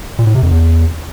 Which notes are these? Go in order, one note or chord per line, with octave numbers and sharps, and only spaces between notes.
A#2
A2
C3
F2
E2